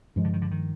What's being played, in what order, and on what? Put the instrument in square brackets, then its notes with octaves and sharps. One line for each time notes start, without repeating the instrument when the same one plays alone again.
[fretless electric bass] G2 F3 G#3 [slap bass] D#3
[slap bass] D3
D#3
D3
D#3